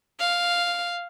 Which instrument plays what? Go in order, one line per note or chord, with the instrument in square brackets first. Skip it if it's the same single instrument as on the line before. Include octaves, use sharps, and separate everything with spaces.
[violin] F5